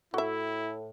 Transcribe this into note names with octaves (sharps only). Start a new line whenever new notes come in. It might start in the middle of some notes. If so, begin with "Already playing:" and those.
A2 E4 F#4 E5